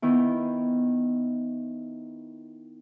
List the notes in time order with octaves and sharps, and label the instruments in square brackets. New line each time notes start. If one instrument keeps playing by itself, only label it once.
[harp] D#3 B3 E4